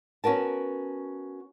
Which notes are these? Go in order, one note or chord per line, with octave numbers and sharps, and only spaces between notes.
B3 C#4 F#4 A#4 A5